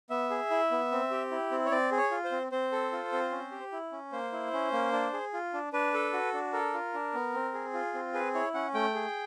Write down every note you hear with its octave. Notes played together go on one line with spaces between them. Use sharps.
B3 E5
G#4
E4
B3
C4
G4
E4
C4
C#5
C4 D5
G#4
C#5
F4
C5
C4
C4 C5
A4
F4
C4
C#4
G4
E4
C#4
A#3 C5
E4
C#4
A#3
D4
G#4
F4
D4
D4 B4
A4
F#4
D4
A4 A#4
F4
D4
B3
C4
G#4
F4
C4
G#4 B4
E4 C#5
C#4 F#5
A3 G5
G#4